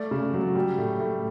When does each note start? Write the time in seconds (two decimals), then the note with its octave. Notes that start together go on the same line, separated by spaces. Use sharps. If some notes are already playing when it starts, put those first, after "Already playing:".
Already playing: A3 D5
0.11 C#3
0.34 F#3
0.56 G3
0.78 A2
1.00 A2